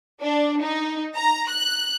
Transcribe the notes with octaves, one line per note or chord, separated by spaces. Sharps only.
D4
D#4
A#5
F#6